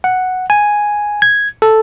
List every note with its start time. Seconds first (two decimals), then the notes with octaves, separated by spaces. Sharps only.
0.04 F#5
0.50 G#5
1.22 G#6
1.62 A4